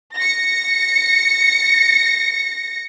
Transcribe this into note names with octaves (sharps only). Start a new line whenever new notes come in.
A#6 C#7